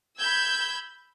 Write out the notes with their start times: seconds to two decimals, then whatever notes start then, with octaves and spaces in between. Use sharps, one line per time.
0.17 B5 E6 G6 G#6